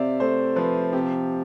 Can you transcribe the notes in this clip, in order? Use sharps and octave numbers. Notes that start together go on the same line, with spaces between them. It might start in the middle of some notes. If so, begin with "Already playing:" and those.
Already playing: C3 C4 D5 E5 F5
A3 C5
F3 B4
C3 G4